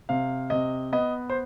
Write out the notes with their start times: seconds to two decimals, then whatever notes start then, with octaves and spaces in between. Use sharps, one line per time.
0.09 C3 F5
0.50 C3 D#5
0.93 B3 D#5
1.30 C5